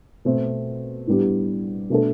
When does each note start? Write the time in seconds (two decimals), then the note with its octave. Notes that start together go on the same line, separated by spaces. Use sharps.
0.25 B2 A3 C4
1.07 A2 G3 B3 D4 G4
1.90 B2 A3 D4 A4